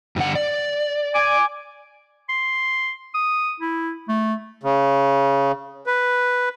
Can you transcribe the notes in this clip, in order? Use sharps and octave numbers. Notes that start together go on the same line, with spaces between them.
G2 D3 F#5
D5
G#5 D6
C6
D#6
E4
A3
C#3
B4